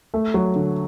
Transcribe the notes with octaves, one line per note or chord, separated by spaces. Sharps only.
A3
F#3
D3